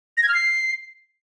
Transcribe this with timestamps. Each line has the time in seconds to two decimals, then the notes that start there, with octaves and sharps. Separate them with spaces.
0.17 A#6
0.23 G#6
0.28 F6
0.34 C7